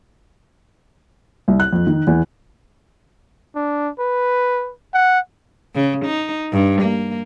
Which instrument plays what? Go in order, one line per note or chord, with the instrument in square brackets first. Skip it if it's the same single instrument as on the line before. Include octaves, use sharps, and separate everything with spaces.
[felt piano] C2
F#6
F2
D#3
E2
[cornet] D4
B4
F#5
[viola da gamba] C#3
D#4
G2
A#3